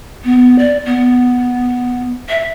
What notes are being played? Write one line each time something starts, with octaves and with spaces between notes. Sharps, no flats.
B3
D5
B3
E5